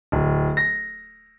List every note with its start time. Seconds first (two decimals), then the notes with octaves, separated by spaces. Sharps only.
0.12 D1
0.57 A#6